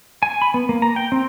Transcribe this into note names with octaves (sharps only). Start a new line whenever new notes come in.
G#5
B5
B3
A#3
A#5
G5
C4